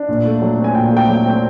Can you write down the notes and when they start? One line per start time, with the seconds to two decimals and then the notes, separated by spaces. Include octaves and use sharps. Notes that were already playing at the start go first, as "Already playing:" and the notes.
Already playing: D4
0.08 A#2
0.25 A3
0.41 F#3
0.58 C4
0.64 G#5
0.75 A#2 G5
0.91 A3
0.97 G5
1.08 F#3
1.25 C4